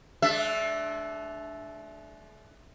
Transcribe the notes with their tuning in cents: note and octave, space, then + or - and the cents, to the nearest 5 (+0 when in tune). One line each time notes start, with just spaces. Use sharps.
G#3 +45 D4 +0 E5 +0